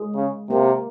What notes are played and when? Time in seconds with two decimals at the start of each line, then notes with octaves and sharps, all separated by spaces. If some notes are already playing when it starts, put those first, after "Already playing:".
Already playing: G#3
0.15 C#3
0.50 C3 A#3